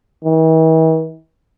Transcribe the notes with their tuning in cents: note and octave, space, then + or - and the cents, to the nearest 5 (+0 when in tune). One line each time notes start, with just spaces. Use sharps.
E3 -45